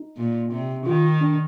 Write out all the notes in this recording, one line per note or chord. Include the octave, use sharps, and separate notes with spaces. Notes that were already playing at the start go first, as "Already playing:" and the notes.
Already playing: D#4
A#2
C3
D#3 F4
D4